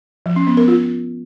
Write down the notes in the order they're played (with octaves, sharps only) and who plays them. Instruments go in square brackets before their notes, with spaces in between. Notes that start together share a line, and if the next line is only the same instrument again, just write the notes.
[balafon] F3
C#4
B3
A#4
F4